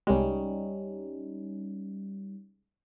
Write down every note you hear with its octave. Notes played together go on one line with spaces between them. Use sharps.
C2 G3 G#3 C#4 D#4